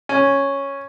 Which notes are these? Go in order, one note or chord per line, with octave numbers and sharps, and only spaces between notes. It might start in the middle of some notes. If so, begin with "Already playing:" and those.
C#4